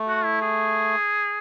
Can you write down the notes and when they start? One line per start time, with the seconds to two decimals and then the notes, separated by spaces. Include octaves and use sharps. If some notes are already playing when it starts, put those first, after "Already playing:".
Already playing: A3
0.08 F#4
0.25 E4
0.42 G#4